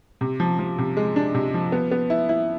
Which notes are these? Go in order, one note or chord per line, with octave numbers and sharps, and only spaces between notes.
C3
F3
F3
C3
G#3
D4
C3
F3
B3
B3
E4
E4